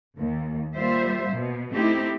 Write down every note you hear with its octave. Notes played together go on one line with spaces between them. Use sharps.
D#2
G3 A#3 F4 C5 E5
B2
A3 C4 D#4 E4 G4